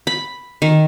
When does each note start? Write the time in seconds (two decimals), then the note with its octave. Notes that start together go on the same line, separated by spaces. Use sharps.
0.07 B5
0.62 D#3